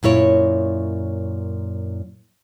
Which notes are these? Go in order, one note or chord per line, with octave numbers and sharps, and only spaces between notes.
F#2 A#2 E4 C#5